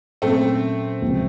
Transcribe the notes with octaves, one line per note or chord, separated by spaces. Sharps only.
A#2 F#3 A3 A#3 C4 C#4
C#2 C3 F3